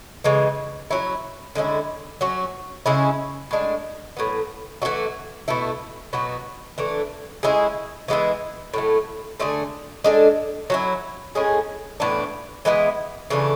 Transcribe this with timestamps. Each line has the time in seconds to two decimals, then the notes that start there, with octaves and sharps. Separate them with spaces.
0.24 C#3 E3 G#3
0.91 F#3 C#4 E4
1.55 D3 G#3 C#4 E4
2.21 F#3 C#4 F#4
2.86 C#3 G#3 C#4 E4
3.51 A2 G#3 D4
4.17 A2 F#3 B3
4.82 E3 A3 D4 F#4
5.48 B2 A3 E4
6.13 B2 F#3 B3 F#4
6.78 E3 A3 D4
7.43 G#3 C#4 E4 G#4
8.08 E3 G#3 B3 E4
8.74 A2 F#3 A3
9.40 D3 A3 D4 G#4
10.04 G#3 D4 A4
10.70 F#3 C#4 E4
11.35 A2 G#3 C#4 G#4
12.00 A2 E3 B3 D4
12.65 E3 G#3 B3 E4
13.30 C#3 E3 A3 D4